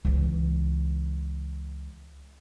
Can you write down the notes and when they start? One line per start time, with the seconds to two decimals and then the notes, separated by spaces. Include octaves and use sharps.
0.05 C#2 E3